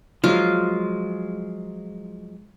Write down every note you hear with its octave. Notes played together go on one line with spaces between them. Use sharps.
F3 F#3 G#3 F4